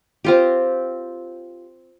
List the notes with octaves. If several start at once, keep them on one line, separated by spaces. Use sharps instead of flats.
C4 F4 G4